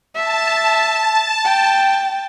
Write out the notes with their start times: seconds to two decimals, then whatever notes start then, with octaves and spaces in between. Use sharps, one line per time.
0.15 E5 A5
1.44 G5